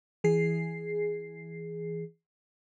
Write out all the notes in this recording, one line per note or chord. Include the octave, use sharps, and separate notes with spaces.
E3 G#4 C7